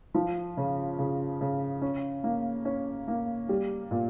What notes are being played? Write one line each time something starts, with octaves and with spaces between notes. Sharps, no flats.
F3
C#3
C#3
C#3
C#4
A#3
C#4
A#3
G3
A#2